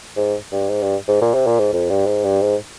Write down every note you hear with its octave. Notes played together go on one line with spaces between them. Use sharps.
G#2
G2
G#2
G2
G#2
A#2
C3
A#2
G#2
F2
G2
G#2
G2
G#2